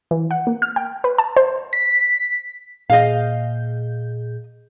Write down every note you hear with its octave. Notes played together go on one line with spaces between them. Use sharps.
E3
F#5
A#3
F6
G5
B4
A5
C5
B6
A#2 G#4 D#5 F5 G6